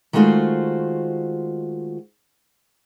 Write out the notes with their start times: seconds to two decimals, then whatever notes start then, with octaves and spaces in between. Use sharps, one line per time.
0.13 D#3 G#3 A3 F4 F#4 C5